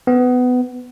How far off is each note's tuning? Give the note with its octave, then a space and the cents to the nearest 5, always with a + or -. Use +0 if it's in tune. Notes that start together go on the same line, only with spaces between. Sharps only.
B3 +20